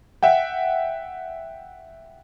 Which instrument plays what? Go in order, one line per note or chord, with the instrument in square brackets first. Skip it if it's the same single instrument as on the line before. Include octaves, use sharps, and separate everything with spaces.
[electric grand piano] E5 F#5 G5